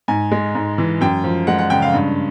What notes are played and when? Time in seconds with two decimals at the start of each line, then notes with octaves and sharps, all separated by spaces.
0.08 G#2 G#5
0.31 G#3
0.55 G#2
0.78 E3
1.01 F#2 G5
1.24 F3
1.47 G#3 F#5
1.59 F#5
1.70 C#3 G5
1.82 F5
1.93 G2